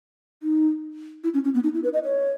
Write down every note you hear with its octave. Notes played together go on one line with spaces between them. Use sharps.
D#4
E4
C#4
C#4
B3
D#4
E4
B4
D#5
C#5